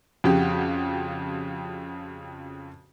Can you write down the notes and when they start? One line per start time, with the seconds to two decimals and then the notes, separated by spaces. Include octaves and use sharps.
0.24 F2 C#3 F#4 G4